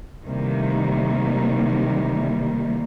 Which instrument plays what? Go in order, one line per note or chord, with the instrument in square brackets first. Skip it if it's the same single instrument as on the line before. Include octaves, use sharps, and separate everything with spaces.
[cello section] C3 D#3 E3 G3 A3 A#3